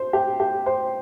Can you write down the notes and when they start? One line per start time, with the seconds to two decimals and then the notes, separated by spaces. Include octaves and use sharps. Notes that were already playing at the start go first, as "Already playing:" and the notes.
Already playing: C5
0.13 G4
0.40 G4
0.66 C5